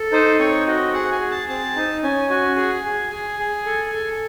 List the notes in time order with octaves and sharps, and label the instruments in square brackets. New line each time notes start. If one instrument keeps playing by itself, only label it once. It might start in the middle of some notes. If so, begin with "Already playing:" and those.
Already playing: [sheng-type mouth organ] A4
D#4 C5
C4 C#5
F#4 D#5
G#4 F#5
G#5
G#4
A5
C4 A5
D#4
C#4 G#5
F#4 G#5
G#4 G#5
G#4
G#4 G#5
G#4
A4
A4